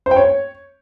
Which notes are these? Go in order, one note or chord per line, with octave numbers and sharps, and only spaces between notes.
C5
G5
C#5